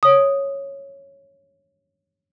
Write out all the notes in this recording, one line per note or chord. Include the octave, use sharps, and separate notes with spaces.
C#5 D#6